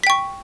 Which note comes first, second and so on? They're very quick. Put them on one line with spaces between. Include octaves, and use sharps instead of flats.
B6 G5 C#6